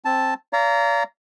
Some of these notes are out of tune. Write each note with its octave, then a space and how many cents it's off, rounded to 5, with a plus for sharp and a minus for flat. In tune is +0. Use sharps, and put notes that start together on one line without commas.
C4 +10 A5 +0
D5 -40 F5 -25 A#5 -5